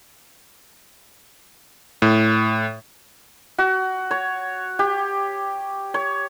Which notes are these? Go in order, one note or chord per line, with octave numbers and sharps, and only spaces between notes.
A2
F#4
C#5
G4
C#5